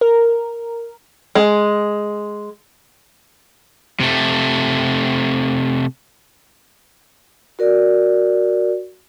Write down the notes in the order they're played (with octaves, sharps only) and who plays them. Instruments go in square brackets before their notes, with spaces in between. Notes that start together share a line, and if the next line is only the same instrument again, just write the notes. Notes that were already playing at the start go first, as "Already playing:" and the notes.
[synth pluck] A#4
[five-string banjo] G#3
[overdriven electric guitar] C3 A3
[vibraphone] F#4 A#4 D5